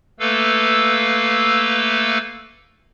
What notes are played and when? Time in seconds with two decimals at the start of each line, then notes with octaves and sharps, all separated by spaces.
0.20 A3 A#3 A4 B4 F5 E6